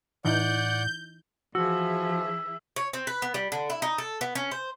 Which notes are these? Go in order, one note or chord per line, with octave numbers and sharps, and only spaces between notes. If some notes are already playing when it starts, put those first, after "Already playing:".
A2 E3 D#4 D5 F#5 G6
E3 F3 F#4 G#4 E5 E6
C#5
C4
B4
B3
G3
D3
E4
D#4
A4
B3
C#4
C5